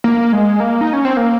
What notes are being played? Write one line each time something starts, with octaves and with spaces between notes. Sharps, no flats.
A#3
G#3
A#3
D#4
C#4
C4
A#3